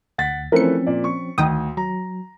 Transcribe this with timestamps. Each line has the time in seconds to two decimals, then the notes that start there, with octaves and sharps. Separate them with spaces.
0.18 D2 F#5 A6 B6
0.52 E3 F3 A3 C4 C#4 A#4 B4 C#7
0.87 A#2 D5
1.04 C#6
1.38 D2 D#3 G5 D#6
1.77 F#3 A#5